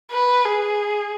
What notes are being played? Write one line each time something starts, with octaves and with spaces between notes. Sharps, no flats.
B4
G#4